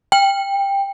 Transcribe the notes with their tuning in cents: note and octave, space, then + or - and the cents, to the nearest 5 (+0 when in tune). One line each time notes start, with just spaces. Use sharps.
G5 +15